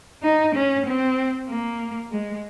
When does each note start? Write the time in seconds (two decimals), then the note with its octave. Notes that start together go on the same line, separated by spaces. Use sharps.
0.23 D#4
0.55 C#4
0.86 C4
1.49 A#3
2.11 G#3